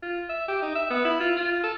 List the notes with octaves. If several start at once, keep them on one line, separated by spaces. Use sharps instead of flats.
F4
E5
G4
D#4
E5
B3
E4
F4
F4
A4